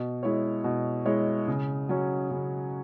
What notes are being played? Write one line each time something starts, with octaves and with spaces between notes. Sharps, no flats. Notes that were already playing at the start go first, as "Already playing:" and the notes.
Already playing: B2
G#3 E4 C#5
B2
G#3 E4 C#5
C#3
F#3 C#4
C#3